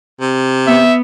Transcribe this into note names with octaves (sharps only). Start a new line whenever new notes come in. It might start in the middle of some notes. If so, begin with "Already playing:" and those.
C3
B3 E5